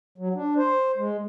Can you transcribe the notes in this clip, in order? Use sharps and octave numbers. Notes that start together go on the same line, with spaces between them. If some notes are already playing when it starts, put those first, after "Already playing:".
F#3
D4
C5
G#3